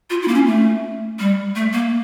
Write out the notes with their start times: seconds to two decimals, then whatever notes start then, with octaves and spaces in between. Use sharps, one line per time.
0.10 F4
0.22 E4
0.28 A#3
0.34 C#4
0.46 A3
1.19 G3
1.55 A3
1.73 A#3